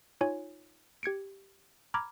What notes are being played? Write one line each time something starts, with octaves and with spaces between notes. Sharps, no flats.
D#4 F4 C#5 G#5
G4 G#6 C#7 D7
A#5 B5 D6 F6 G#6